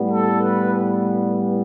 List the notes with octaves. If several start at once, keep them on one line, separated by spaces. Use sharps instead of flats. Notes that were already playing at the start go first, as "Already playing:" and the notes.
Already playing: A2 G3 B3
A4
B4